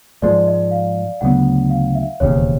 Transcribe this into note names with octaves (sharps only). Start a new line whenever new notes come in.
G#2 F3 G#3 D5
D#5
F5
D2 C#3 F#3 B3 F#5
F5
E5
E1 D#2 C#3 C#5
C5